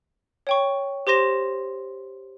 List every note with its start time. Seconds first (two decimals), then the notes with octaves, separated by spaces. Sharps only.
0.47 C#5 G5 C#6
1.07 G4 C5 C6 A#6 E7